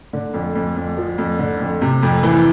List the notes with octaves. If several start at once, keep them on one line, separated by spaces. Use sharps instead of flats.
D3
F2
F2
F2
F3
F2
D3
F2
C3
F2
E3